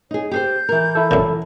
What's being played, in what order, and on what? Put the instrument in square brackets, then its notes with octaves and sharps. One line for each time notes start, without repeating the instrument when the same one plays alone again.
[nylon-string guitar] D#4 G#4 [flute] C#5
[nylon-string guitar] G4 G#4 C5 [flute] G6
[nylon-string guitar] E3 A#4
[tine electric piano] E4 A4
[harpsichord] F#2 A#2